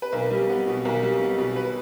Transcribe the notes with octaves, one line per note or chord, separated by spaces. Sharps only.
B4
B1 A#4
G3
B3
B2
B1 A#4
G3
B3
B2
B4